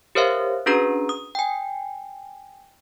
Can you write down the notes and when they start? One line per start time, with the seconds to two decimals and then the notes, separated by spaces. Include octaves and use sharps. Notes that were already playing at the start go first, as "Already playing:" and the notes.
0.15 G4 A#4 C5 C#5 E5 F5
0.66 C#4 D4 F#4 G#4 B4 A#5
1.09 D#6
1.35 G5 G#5